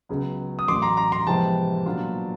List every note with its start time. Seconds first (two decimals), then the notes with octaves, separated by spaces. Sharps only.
0.09 C#2 C#3 F#3 B3
0.59 D#6
0.68 A1 A2 F#3 C6 D6
0.82 A#5 C6
0.97 A#5 C6
1.12 A#5 C6
1.27 F2 C3 E3 G#3 B3 G5 A5
1.86 A#2 F#3 B3 D4 F4